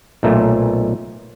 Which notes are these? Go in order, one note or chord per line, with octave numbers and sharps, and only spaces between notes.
B1 A#2 A3